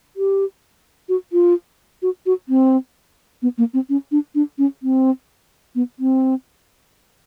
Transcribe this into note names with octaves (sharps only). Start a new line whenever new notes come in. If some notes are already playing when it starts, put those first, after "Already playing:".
G4
F#4
F4
F#4
F#4
C4
B3
A#3
C4
C#4
D4
D4
C#4
C4
B3
C4